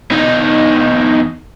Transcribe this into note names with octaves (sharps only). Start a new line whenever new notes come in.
E2 D#4